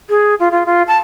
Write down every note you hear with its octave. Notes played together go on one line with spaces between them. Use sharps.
G#4
F4
F4
F4
A5